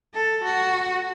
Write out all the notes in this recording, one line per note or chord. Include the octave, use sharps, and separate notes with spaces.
A4
F#4